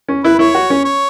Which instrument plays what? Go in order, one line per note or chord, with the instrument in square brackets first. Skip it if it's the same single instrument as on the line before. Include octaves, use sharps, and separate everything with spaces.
[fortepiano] C#4
[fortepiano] E4 [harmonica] B4
[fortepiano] E4 [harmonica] C#5
[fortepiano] F#4
C#4
[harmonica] C#5